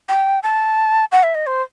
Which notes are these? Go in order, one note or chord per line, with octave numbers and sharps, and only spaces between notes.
G5
A5
F#5
E5
D#5
C5